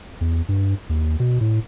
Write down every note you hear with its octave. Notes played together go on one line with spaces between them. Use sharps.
E2
G2
D#2
B2
A2